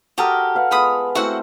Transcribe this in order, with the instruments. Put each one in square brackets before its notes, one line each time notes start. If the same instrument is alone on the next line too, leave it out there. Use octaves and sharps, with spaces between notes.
[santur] F#4 A4 A#4 [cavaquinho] G4 A5 D#6
[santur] B4 F5 F#5
[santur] G#3 B3 [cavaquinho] F4 B5 D#6
[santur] A3 C4 E4 [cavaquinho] F#4 C5 F#5